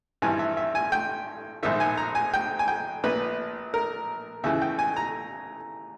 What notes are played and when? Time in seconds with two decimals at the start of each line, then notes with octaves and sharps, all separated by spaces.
0.22 G#1 G2 E3 G#5
0.39 E5
0.57 E5
0.75 G#5
0.92 G5
1.63 A#1 G#2 D#3 E5
1.80 G#5
1.97 A#5
2.15 G#5
2.34 G5
2.59 G#5
2.68 G5
3.04 A#1 A#2 B4
3.74 A#4
4.44 D#2 C#3 E3 E5
4.62 G5
4.79 G#5
4.96 A#5